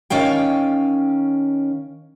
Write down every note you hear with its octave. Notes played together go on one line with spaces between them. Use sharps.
D#3 C#4 F5 G5